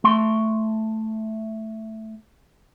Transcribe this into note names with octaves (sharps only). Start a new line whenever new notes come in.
A3 C6